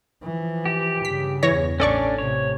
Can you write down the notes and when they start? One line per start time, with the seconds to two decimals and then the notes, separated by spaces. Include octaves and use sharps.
0.23 E3 F3
0.66 G4
1.05 G2 C#3 B6
1.43 E2 C#5 A#6
1.80 A1 C#4 D4 A4 D5 C#6
2.18 A2 C3 C#5